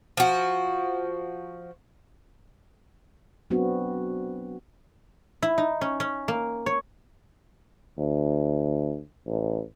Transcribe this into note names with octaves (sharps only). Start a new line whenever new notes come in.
F3 F#4
F#3 B3 C4 D4 F#4
E4
D#4
C#4
C#4
A#3
C#5
D2
A1